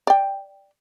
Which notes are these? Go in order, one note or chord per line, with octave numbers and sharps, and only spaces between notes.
D5 G5